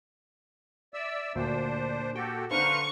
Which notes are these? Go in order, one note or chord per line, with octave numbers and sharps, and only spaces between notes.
D5 E5 E6
D2 A#2 D4 C5
F#4 G4 A4 G5
D3 D4 B4 C5 F5 F#5 A#5 C#6